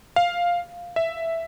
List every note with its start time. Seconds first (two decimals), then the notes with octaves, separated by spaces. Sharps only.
0.16 F5
0.96 E5